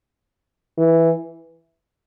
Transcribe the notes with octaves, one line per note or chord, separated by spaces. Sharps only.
E3